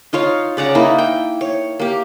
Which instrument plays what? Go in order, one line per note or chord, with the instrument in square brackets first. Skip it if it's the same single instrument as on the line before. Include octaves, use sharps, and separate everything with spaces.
[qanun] D#4 F4 C#5 F5
C#3 D5 F#5 A#5
A#3 D#4 E4
G5
C#5
A#3 G4